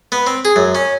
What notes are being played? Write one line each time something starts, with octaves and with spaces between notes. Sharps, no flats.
B3
C4
G#4
F#2
C#4